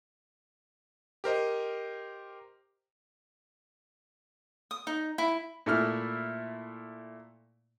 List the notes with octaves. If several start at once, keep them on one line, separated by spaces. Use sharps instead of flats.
G4 A#4 C5 D#5
D#6
D#4
E4
A#2 A3 E4 F6